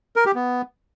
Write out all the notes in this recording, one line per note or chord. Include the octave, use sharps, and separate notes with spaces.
A#4
G4
B3